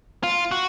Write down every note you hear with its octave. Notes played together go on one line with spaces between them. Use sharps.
F4
F#4